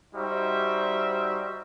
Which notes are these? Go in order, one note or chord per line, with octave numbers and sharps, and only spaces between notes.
G3 D#4 F#4 C5 E5